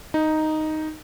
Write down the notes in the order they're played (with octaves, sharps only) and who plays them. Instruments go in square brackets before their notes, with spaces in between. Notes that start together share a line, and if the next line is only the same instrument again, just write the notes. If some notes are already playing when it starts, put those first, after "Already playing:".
[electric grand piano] D#4